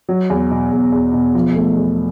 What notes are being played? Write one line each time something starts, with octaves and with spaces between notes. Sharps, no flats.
F#3
E2
B2
E2
E2
B2
F3
A3
E2